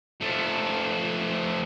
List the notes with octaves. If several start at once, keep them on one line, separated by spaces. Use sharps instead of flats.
F3 A3